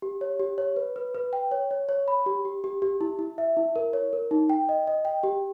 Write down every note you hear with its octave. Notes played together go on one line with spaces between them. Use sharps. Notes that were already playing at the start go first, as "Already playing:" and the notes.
G4
C#5
G4
C#5
B4
B4
B4
G5
C#5
C#5
C#5
B5
G4
G4
G4
G4
E4
E4
E5
E4
A#4
C#5
A#4
D#4
G5
D#5
D#5
G5
G4